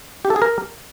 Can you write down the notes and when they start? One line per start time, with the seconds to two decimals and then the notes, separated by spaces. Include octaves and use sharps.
0.25 G4
0.30 A4
0.36 G#4
0.42 A#4